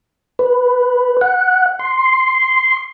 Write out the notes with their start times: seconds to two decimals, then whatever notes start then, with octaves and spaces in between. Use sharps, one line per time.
0.39 B4
1.21 F#5
1.79 C6